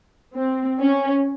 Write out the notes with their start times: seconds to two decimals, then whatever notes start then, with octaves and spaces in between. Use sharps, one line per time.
0.36 C4
0.79 C#4